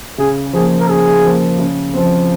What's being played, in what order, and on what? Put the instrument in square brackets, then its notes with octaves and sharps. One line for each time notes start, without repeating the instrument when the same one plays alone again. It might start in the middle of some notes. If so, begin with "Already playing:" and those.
[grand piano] C#3 [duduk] G#4
[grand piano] F3 A#3 [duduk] G#4
[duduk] A#4
[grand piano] C#3 [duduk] G#4
[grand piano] F3 A#3
C#3
F3 C4